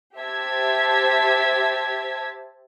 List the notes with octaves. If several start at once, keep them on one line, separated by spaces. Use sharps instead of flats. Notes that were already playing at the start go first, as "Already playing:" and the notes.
G4 C5 E5 A5 G#6 B6